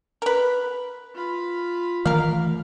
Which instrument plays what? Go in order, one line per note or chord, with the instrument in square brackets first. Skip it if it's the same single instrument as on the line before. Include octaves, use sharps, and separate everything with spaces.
[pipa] A#4 B4
[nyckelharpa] F4 B5
[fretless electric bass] D#3 E3 A3 [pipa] A#4 F5